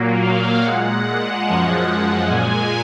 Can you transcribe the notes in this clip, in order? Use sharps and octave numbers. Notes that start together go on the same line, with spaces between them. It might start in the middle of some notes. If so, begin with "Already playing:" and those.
Already playing: A#2 F#3 A#3
F5
A#2 G#3 F#5
F#2 F3 G#3
A#2 G#3 G#5